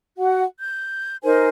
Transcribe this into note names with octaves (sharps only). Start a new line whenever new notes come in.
F#4 F#5
G6
D#4 A#4 C5 G#5